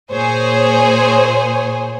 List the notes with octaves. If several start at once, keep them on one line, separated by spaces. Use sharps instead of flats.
A#2 G#4 C5 C#5 G#5